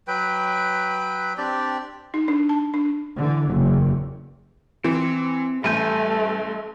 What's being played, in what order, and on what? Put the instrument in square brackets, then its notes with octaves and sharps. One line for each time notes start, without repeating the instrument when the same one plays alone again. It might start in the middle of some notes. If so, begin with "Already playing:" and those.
[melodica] F#3 B4 G5
C4 D4 G4 D5
[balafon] D#4
D4
A5
D4
[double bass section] D3 E3
F#1 E2
[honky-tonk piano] E3 [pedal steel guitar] C4
[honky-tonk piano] A1 [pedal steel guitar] G3 G#5 G6 [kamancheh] A3